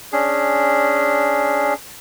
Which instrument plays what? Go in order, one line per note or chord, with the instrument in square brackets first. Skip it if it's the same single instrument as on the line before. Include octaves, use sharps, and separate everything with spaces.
[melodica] C#4 D4 G#4